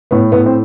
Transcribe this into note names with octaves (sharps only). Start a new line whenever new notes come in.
A2 B3
A2 B3
C4